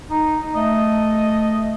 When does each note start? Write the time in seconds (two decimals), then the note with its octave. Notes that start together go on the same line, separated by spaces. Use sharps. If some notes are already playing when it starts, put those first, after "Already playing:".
0.11 D#4
0.55 A3 D#5